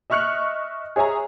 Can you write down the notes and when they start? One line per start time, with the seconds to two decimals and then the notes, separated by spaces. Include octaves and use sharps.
0.10 D#5 E5 C#6 F6 F#6 C#7
0.96 G#4 C#5 E5 G#5 A#5